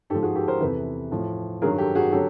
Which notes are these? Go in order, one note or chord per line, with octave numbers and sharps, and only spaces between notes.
G#2 F3 G4 A4
F#4 G#4
G4 A4
A#4 C5
E2 C3 E3 A4 B4
A2 F3
G2 D#3 F#3 G#4 A#4
G4 A4
F#4 G#4
D3 F#3 G4 A4